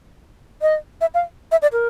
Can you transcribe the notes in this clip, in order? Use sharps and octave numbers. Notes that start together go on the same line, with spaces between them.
D#5
E5
F5
E5
D5
A#4